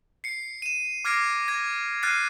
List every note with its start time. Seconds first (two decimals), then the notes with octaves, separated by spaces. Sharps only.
0.24 C7 C#7
0.62 D#7 E7
1.05 D6 F6 G#6 A#6 C7 D7
1.48 G#6 A#6
2.03 F6 F#6 A6 C7 D#7